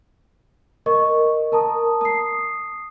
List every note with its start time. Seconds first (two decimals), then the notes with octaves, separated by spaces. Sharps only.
0.86 A#4 D#5 C#6
1.52 A#4 A5 A#5 D#6
2.01 D#6 C7